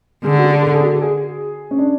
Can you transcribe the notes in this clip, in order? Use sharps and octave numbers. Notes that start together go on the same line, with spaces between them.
D3 G#4
F#4
G#4
A4
G#4
F#4
G#4
C#4
D4